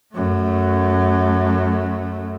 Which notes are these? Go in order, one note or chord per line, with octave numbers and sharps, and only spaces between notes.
F#2 A3